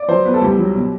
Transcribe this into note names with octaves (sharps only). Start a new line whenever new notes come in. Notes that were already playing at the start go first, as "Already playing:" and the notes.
Already playing: D5
F#3 C5
B3 B4
A4
C2 G4
F#3
B2